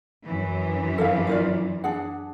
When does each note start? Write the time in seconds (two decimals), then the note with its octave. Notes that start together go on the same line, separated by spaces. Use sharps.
0.25 F#2 E3
0.98 A4 A#4 F5
1.27 F4 A#4 D5
1.84 D4 G#4 F#5